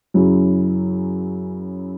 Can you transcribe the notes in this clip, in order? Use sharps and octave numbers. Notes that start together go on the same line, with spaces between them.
F#2 C#3 F#3 E4